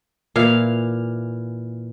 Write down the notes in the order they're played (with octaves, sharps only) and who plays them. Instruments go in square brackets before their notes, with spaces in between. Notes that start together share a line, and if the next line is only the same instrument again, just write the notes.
[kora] A#2 E3 F5